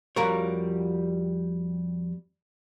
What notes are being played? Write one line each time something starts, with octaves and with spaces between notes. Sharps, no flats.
F2 G3 F4 F#4 A#4 C#5